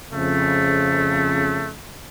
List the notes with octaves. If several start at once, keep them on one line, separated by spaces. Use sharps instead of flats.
F2 C#3 A3